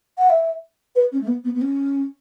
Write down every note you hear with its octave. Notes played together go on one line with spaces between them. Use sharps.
F#5
E5
B4
C#4
A3
B3
B3
B3
C#4